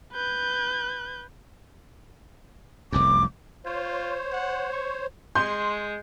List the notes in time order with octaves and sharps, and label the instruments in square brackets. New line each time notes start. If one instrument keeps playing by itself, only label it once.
[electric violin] B4 G6
[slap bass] F1 C2 F#2 [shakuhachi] D6
[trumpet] F4 [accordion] C5 C#5
[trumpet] F#5
C#6
[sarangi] G#3 [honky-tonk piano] C6 G6